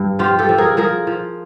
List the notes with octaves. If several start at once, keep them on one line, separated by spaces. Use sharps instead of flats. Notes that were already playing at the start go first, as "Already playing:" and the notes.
Already playing: G2
F3 F4 G4
G4 A4
F3
G#4 A#4
F3 G#4 A#4
F3